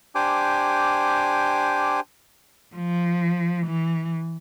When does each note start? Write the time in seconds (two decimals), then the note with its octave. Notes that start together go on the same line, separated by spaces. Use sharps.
0.15 D4 G4 C5 G#5 D6
2.76 F3
3.67 E3